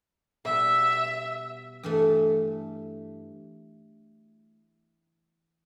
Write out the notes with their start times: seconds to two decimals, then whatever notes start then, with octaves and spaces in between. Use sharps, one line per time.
0.45 B2 G3 B3 E5
1.83 G2 E3 A3